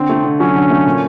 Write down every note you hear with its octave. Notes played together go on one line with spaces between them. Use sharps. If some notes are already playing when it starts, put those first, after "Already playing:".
Already playing: D3 C4
A3
D3
F#3 C#4
D3
A3
A#2